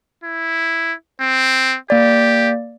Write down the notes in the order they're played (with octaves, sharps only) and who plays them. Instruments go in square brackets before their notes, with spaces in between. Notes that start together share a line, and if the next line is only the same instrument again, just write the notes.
[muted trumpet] E4
C4
[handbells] A#3 D5 [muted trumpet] G4